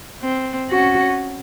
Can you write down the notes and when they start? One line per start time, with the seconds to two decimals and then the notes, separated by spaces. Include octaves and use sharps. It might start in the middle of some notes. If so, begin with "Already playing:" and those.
0.22 C4
0.70 C#4 F#4